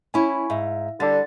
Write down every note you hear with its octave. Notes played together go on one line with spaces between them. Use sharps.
C#4 E4 G#5 B5 C#6
G#2 E5 F5
D3 G3 A6